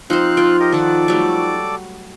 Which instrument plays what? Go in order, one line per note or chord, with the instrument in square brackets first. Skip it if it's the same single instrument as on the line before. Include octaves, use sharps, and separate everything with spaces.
[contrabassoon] F3 [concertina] C4 F5 F#6 [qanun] D#4 C5
[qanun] F4 G5
[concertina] G4 A#4 D#5
[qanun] D#3 F#5 [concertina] A4 D5 D6
[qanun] F#3 G3 A3